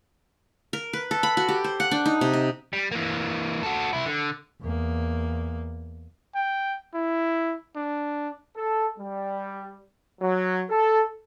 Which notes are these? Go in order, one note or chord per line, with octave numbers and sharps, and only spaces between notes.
A#4
B4
A4
B5
F#4
G4
C5
F#5
D4
D#4
C3
D#5
G3
E3 A#3
F#4 A4
C2 E4
D3
E2 A#3
G5
E4
D4
A4
G3
F#3
A4